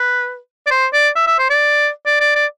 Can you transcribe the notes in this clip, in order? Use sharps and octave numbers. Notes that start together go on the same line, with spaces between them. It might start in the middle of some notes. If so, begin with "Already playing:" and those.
Already playing: B4
D5
C5
D5
E5
E5
C5
D5
D5
D5
D5